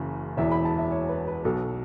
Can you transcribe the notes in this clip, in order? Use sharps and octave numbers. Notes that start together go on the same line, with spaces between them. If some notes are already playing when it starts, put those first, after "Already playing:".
Already playing: F#1 F#2 C#3 E3
E1 E2 E3 E5
B5
A5
E5
C#5
B4
B4
B1 B2 A4